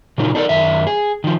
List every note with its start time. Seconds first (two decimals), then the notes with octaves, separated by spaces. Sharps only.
0.18 A#2 C#3 F#3 D#4 F4
0.35 D4 D#4 A4 A#4 D5
0.49 F#2 D#3 E5
0.87 G#4
1.24 D#3 F3